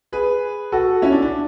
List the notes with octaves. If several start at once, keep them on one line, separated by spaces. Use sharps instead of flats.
G#4 B4
F#4 A4
C#4 E4
D4
D4